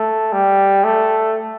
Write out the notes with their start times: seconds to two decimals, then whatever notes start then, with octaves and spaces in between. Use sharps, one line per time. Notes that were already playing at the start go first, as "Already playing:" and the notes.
Already playing: A3
0.32 G3
0.84 A3